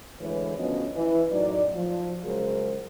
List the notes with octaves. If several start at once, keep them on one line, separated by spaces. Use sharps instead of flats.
D2 E3 G#3 B4 C#5
D2 F3 B3 C#4 F#4 D#5
E3
F#2 A2 F#3 D#4 D5
F3
C#3 F#3 G#3 G#4 A#4 C5